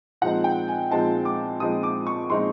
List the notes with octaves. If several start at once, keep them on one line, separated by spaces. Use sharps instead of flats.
A#2 F3 G#3 C4 D#4 F#5
G5
G#5
A#2 F3 G#3 C4 D#4 A5
D6
A#2 F3 G#3 C4 D#4 D#6
D6
C#6
A#2 F3 G#3 C4 D#4 C6